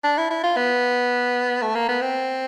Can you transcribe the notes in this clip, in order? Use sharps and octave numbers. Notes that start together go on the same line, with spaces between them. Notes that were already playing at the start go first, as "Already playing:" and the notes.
D4
E4
E4
F4
B3
A3
A#3
B3
C4